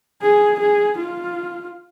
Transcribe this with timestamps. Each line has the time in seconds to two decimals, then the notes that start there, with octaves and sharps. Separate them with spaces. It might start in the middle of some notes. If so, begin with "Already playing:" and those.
0.22 G#4
0.60 G#4
0.99 F4